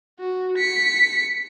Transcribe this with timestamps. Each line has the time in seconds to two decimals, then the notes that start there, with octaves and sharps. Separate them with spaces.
0.20 F#4
0.58 B6 C#7